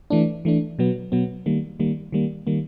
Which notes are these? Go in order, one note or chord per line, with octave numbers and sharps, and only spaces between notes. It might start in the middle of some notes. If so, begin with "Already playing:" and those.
E3 A3 D4
E3 A3 D4
B2 F#3 B3
B2 F#3 B3
D#3 G3 A#3
D#3 G3 A#3
D#3 G3 A#3
D#3 G3 A#3